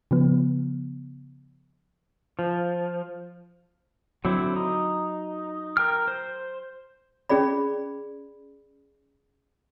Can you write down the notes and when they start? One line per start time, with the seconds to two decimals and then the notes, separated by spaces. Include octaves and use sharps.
0.11 C#3 F3 B3
2.39 F3
4.25 D3 F#3 C4 E4
4.56 D#4
5.77 A#4 G5 F6
6.08 C5
7.29 C#4 G#4 D5 B5